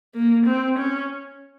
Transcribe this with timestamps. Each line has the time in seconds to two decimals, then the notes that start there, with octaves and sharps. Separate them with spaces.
0.15 A#3
0.46 C4
0.78 C#4